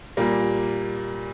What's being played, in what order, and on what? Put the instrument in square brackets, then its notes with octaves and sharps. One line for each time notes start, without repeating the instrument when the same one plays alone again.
[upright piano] A#2 G3 A#3